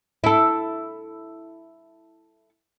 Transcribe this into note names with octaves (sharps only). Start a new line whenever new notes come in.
E4 A4